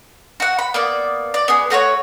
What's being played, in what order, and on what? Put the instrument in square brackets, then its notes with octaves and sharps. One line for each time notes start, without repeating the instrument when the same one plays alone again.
[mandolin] F#4 F#5
B5
A#3 B3 D5
D5
B3 G#4
A3 F#4 A#4 C#5